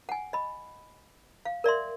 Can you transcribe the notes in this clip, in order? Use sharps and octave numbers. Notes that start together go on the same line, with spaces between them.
F#5 G#5
D#5 B5
F5
A#4 D5 E5 C6